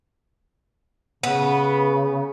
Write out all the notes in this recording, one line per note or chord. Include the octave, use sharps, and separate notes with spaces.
C#3 B3